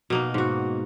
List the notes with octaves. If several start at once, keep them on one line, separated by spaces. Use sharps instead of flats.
B2 A#3 D#4
G#2 F#4